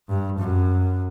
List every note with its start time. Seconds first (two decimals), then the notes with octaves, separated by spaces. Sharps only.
0.09 G2
0.39 F#2